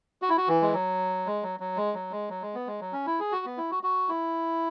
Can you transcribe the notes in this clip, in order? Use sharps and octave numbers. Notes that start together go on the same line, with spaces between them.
F#4
E4
F#4
E3
G#3
F#3
G#3
F#3
F#3
G#3
F#3
G#3
F#3
G#3
B3
G#3
F#3
C#4
E4
G#4
F#4
B3
E4
F#4
F#4
E4